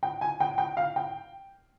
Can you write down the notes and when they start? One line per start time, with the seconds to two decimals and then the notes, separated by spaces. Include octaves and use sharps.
0.03 G5
0.21 G#5
0.40 G5
0.58 G5
0.77 F5
0.96 G5